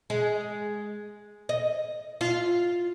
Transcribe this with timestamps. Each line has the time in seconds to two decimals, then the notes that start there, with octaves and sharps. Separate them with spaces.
0.10 G#3
1.49 D#5
2.21 F4